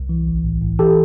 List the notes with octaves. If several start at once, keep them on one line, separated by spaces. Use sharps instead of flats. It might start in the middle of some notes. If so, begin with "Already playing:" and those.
Already playing: C2
E3
A1
A2
A2
E3 G4 A4